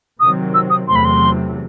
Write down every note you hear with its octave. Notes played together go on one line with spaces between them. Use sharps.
C3 D#3 F#3 C4 D#6
E6
D#6
E2 C3 F#3 A3 C4 C6
B5
C6